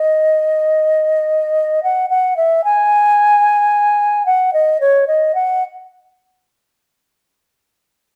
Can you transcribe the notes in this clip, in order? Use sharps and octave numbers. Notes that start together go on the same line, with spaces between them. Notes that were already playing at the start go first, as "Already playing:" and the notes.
Already playing: D#5
F#5
F#5
E5
G#5
F#5
D#5
C#5
D#5
F#5